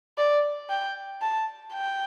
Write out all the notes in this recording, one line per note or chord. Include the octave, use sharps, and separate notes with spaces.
D5
G5
A5
G5